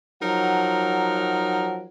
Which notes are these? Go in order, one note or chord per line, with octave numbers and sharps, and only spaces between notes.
F3 F#3 D#4 A#4 F#5